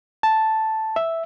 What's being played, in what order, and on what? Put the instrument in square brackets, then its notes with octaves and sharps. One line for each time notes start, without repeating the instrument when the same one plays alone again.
[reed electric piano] A5
E5